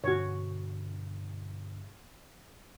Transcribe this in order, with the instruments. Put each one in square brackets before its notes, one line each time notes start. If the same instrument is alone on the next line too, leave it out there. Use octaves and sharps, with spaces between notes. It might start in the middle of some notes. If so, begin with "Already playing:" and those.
[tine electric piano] G2 B2 D3 [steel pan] F#4 C#5